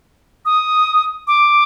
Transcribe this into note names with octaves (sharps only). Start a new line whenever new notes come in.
D#6
D6